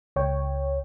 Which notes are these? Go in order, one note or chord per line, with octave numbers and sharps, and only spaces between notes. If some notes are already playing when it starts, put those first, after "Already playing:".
C#2 C#5 G5